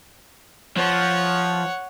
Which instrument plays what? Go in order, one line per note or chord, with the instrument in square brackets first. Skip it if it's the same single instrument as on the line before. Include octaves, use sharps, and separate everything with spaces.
[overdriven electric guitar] F3 [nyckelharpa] C#5 F#5